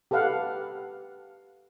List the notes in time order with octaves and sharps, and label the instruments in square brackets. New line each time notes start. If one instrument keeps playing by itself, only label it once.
[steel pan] G4 A4 B4 F5 F#5